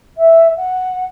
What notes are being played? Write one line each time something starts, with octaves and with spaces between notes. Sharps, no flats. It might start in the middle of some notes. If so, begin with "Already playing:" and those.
E5
F#5